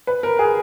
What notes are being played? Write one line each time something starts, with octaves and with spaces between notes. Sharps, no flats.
B4
A#4
G#4